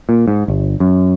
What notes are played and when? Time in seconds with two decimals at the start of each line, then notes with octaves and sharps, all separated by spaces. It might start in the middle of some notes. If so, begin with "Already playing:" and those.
0.09 A#2
0.28 G#2
0.48 G1
0.80 F#2